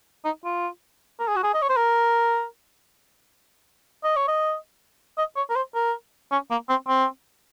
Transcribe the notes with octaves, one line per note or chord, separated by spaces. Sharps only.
D#4
F4
A#4
G#4
F#4
G#4
D#5
C#5
C5
A#4
D#5
C#5
D#5
D#5
C#5
A#4
C5
A#4
C#4
A#3
C4
C4